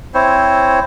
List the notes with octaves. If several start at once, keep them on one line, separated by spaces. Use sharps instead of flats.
C4 E4 C5 C#5